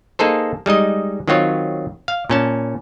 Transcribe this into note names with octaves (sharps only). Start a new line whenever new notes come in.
A#3 D#4 G#4 A4 C5
G3 G#3 D#4 D#5
D#3 F#3 C4 F4 C#5
F5
A#2 C#4 A5